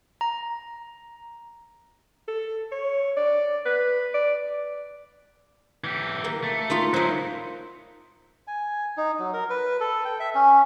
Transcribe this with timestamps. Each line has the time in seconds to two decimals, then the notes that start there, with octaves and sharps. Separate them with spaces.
0.21 A#5
2.28 A4
2.72 C#5
3.16 D5
3.65 B4
4.14 D5
5.84 E3 G4
6.24 A#3
6.44 A3
6.70 A#3 D#4 F4
6.94 F#3 D#4 E4 C5
8.47 G#5
8.97 D#4
9.19 F#3
9.33 A#4
9.50 B4
9.80 A4
10.05 G5
10.20 E5
10.35 C#4